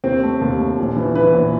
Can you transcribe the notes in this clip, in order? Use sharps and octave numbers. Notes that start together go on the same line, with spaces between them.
D#2 C4 C5
A3
D#2
A3
A#1
E3
E3 B4
A#1